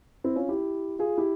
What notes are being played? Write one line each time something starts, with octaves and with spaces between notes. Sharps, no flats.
C4 E4
C#4 F4
E4 G4
F4 G#4
E4 G4